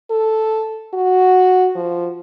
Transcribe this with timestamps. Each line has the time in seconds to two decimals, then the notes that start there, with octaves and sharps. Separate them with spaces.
0.10 A4
0.94 F#4
1.75 F3